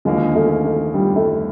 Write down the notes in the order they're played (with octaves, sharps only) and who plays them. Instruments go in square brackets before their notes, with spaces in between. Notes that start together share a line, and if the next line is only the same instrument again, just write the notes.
[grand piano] D#2 D3 F3 A#3 [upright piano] G#3
[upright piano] A3
A3
G3
A3